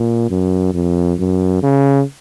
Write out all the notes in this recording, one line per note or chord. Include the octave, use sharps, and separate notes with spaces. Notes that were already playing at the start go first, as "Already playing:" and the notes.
Already playing: A#2
F#2
F2
F#2
C#3